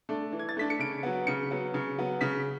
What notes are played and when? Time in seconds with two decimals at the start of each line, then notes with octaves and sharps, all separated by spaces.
0.09 A3 D4
0.32 E3
0.39 G#6
0.49 A6
0.57 A3 D4 B6
0.70 C#7
0.79 C#3 D7
1.03 F#3 B3
1.27 C#3 C#7
1.51 F#3 B3
1.74 C#3
1.98 F#3 B3
2.21 C#3 B6